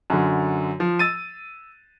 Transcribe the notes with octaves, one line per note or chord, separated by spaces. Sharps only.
F#2 D3
F3
E6 A6 D#7